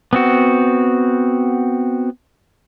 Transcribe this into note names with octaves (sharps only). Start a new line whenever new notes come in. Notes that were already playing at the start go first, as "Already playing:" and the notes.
B3 C4 F#4